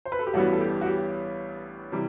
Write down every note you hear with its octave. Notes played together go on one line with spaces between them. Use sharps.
C5
B4
A4
G4
A1 G2 E3 G3 B3 F#4
A4
G4
F#4
G4
C3 E3 G3